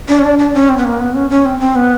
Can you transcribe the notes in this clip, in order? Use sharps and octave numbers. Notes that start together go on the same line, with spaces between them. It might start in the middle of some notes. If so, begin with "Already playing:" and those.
D4
C#4
D4
D4
C#4
C4
B3
A#3
B3
C#4
C#4
C4
C4
B3